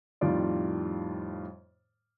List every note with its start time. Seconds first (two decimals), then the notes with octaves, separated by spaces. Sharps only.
0.21 F2 A2 D#3 G3 F4 D5